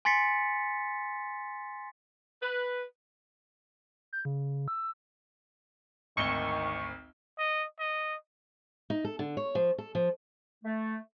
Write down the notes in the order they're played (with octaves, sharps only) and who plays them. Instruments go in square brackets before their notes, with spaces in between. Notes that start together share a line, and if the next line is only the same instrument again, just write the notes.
[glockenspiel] G#5 C6 A6 B6 C#7
[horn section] B4
[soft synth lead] G6
C#3
E6
[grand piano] G#1 D2 G7 [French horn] D#3 [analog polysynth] C#6
[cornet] D#5
D#5
[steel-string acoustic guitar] D#4
A4
D3
C#5
F3
A4
F3
[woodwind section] A3